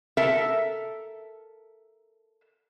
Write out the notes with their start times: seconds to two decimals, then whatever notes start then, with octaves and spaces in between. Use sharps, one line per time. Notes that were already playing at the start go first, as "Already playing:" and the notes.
0.17 A4 A#4 E5